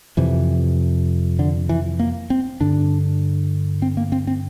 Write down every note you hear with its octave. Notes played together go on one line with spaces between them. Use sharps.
F2 C3 E3
D3
E3
A#3
C4
G2 D3 D4
C4
A#3
C4
C4